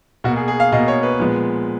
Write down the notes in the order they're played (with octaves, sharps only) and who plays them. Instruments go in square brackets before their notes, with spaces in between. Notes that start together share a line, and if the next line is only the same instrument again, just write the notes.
[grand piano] B2 F#4
A#3
G#4
G#4
F5
B2 A#3 D#5
C#5
B4
A#2 F3 G#3 B3